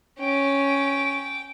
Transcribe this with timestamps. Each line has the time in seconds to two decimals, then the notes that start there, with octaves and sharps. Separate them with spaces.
0.20 C#4 G5 D6